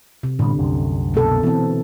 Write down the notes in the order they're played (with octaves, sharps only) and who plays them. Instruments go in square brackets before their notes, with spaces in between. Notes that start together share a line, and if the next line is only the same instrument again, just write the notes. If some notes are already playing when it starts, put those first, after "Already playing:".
[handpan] C3
[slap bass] A2 G3 B3 [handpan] D3
[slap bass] C2 F#2 C3
[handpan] B2 A#3 A4
E3 C4